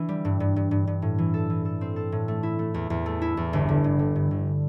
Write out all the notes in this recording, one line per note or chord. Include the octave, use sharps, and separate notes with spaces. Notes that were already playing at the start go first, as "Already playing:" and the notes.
Already playing: E3 D4
G3
G2
G2
G2
G2
G2
A2
E3
A4
E3
A4
C4
A4
A2
A3
E4
A3
E2
E2
A3
E4
E2
G1
D3
G2
D3
G2
G1